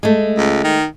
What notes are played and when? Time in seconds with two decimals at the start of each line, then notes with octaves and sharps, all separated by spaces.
0.03 G#3 A3
0.38 C#2
0.64 D#3